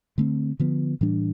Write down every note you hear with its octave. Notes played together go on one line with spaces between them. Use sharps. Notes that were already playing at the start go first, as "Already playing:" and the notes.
D3 A3 C4
D3 F3 B3
A2 E3 G3 D4